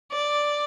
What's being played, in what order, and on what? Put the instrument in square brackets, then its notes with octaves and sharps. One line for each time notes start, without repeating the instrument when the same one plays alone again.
[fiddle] D5